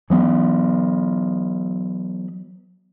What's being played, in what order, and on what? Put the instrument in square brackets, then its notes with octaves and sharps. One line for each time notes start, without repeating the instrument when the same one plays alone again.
[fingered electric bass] E3 F#3 B3